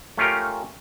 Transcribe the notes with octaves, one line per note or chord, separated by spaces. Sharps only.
A3 C#4 F4 G4 A#4